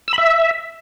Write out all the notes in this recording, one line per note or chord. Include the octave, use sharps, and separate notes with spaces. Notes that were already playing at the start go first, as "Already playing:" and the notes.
E6
B5
E5